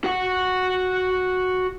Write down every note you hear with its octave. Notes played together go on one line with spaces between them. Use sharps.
F#4 F#5